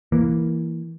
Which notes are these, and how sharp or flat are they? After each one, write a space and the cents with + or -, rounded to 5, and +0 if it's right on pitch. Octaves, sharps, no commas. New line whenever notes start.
E3 +0 A#3 +0